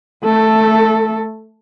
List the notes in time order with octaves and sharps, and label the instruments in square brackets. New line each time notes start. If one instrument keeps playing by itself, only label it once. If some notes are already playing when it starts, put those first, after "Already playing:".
[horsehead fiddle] A3 A4